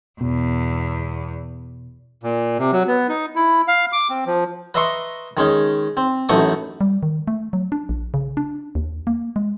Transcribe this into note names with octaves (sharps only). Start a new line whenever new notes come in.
E2 B2
A#2
C3
F#3
B3
D#4
E4
F5
D6
C4
F3
B4 D#5 E5 A#5 C6 C#6
D#3 G#3 C#4 D#4
C4
A1 F#2 A3 D#4 C#6 D#6
G3
D#3
A3
F#3
D4
A#1
C#3
D4
D#2
A#3
G#3